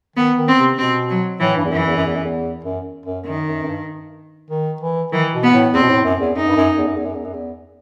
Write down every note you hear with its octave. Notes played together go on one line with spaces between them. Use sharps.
D#3 B3
D#3
C4
C3
B2 C4
F#3
A2 E3
G2
E2
F#2 E3
E2
F#2
E2
F#2
E2
F#2
F#2
F#2 D#3
F#2
F#2
G2
D#3
E3
D#3 E3
B2
B3
A2
E2 C4
B2
A2
F#2
E2
F#2 D#4
G2
F#2
E2
F#2
E2
F#2
E2
F#2
E2